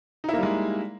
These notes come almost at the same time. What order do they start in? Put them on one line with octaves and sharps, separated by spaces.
D#4 E4 A#3 G3 G#3